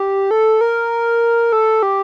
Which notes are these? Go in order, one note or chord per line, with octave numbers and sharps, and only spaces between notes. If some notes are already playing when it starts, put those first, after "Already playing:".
Already playing: G4
A4
A#4
A4
G4